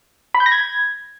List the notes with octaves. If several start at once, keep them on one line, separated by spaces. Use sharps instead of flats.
B5
G6
A#6
G#6